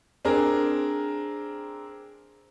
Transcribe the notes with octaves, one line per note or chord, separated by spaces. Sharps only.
C4 D4 G#4 A#4